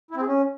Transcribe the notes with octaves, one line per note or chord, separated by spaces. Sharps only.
E4
C4
G#4
C#4